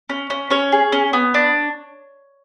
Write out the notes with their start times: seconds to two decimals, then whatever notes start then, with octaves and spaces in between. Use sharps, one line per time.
0.10 C#4
0.30 C#4
0.50 C#4 C#5
0.72 G#4
0.92 C#4
1.13 B3
1.34 D4